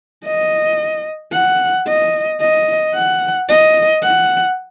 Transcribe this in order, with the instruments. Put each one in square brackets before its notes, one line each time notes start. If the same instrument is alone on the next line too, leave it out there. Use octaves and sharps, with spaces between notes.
[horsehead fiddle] D#5
F#5
D#5
D#5
F#5
D#5
F#5